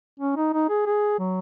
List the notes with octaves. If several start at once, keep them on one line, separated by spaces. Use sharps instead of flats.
C#4
D#4
D#4
G#4
G#4
F#3